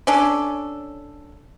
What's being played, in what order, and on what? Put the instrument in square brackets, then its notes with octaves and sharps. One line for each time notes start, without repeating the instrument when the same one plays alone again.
[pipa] C#4 D4 A4